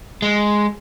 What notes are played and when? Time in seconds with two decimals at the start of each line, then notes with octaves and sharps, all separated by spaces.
0.22 G#3